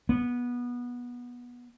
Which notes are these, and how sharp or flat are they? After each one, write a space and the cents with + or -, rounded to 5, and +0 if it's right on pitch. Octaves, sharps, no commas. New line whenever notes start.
B3 -20